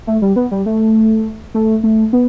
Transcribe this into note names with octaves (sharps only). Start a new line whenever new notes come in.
A3
G3
B3
G3
A3
A3
A3
B3